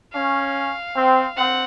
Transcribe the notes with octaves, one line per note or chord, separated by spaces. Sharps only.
C#4 F5
C4
C4 F#5